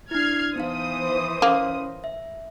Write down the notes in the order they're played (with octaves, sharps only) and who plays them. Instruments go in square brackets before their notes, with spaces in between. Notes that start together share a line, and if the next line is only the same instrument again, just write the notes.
[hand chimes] D4 E4 [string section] F6 G#6 C7
[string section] E3 C5 D#6 [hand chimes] B3 D#4 F5
[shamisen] A#3 [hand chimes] C#4 C6 A#6
[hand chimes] E5